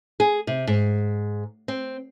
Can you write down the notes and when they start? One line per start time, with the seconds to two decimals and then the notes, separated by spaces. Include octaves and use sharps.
0.20 G#4
0.47 C3
0.67 G#2
1.68 C4